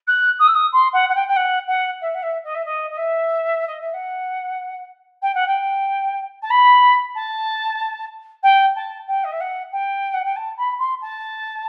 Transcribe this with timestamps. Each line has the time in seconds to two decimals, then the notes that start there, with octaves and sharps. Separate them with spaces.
0.07 F#6
0.39 D#6
0.47 E6
0.54 D#6
0.72 C6
0.93 F#5
1.09 F#5
1.15 G5
1.28 G5
1.36 F#5
1.68 F#5
2.01 E5
2.14 F#5
2.22 E5
2.43 D#5
2.54 E5
2.65 D#5
2.90 D#5
2.97 E5
3.67 D#5
3.80 E5
3.93 F#5
5.22 G5
5.34 F#5
5.47 G5
6.42 A5
6.50 B5
7.14 A5
8.43 G5
8.75 A5
9.07 G5
9.24 D#5
9.31 E5
9.40 F#5
9.72 G5
10.13 F#5
10.24 G5
10.36 A5
10.57 B5
10.79 C6
11.01 A5